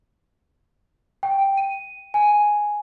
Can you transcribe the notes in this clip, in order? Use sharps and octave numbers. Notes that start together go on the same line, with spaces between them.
G5
D#7
G#5